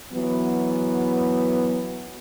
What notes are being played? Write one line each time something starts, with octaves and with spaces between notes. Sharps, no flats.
E3 F#3 B3